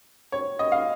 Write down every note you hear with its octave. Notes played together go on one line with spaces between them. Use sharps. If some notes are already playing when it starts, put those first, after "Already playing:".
C#5
D#5
F5